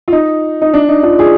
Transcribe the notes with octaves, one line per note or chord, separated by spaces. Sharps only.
F4
D#4
D#4
D4
D#4
D4 F4
F4 G#4